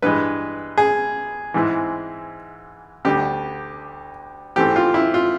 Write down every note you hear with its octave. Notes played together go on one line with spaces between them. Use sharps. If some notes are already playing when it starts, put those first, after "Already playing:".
G2 E3 G#3 B4
G#4
G#2 E3 G#3 C4 E4
D2 D3 G3 G4
G#2 E3 A3 C4 G4
F4
E4
F4